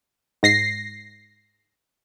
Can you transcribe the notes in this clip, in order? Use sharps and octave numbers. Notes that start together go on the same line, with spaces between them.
G#2 A#6 C7